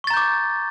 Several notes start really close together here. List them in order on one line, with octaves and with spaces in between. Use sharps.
C#6 A6 A#5 G6 D6